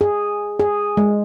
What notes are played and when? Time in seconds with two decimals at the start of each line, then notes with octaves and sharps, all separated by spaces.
0.01 G#4
0.60 G#4
0.97 G#3